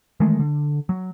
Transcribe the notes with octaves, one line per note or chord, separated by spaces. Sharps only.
D#3 E3 G#3 A3
D3
F#3